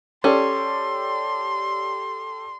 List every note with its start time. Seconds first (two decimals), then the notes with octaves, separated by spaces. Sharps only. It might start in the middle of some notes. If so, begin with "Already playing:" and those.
0.24 C#4 G4 A4 D5 C6